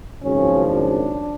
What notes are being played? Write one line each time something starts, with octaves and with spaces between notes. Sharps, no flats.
G#1 F#2 C#3 F3 C#4
D4